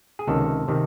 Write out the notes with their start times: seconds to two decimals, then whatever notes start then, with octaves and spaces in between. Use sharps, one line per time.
0.19 G#4
0.27 C#2 C3 D#3 A4
0.68 C3 D#3